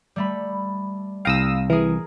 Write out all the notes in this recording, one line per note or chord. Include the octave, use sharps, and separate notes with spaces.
G3 A3 B5
C2 F5 G5 D#6 E6 A#6 D7
E3 G#4 A#4